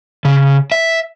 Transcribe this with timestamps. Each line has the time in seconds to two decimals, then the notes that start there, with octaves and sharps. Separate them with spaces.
0.25 C#3
0.72 E5